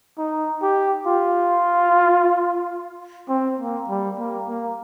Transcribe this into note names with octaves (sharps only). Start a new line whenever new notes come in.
D#4
G4
F4
C4
A#3
G3
A#3
A#3